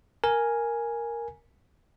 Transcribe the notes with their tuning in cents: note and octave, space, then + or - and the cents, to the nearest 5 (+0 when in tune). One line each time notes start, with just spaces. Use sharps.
A#4 +0 G#5 +0